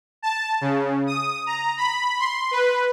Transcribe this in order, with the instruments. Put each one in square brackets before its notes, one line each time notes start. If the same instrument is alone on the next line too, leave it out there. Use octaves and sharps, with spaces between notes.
[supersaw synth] A5
C#3
D#6
A#5
B5
C6
B4